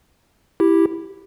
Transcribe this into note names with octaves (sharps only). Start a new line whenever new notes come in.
E4 G4